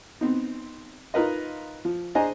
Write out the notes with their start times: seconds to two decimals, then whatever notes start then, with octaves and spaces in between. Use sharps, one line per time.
0.21 B3 C4 D#4
1.14 D#4 F4 A#4 B4 D#5
1.85 F3
2.15 D4 G#4 C5 D#5 G#5 A#5